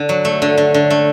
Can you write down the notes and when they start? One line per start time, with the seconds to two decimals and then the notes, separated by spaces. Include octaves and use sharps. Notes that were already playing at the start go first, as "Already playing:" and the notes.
Already playing: D3
0.09 F#3
0.25 A3
0.42 D3
0.57 D3
0.74 D3
0.90 A3